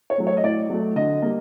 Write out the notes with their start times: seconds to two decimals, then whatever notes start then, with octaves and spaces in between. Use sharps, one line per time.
0.10 C#5
0.18 F#3 A3
0.27 C#5
0.37 D#5
0.44 A2 D5
0.70 F#3 A3
0.96 D3 D#5
1.22 G3 A#3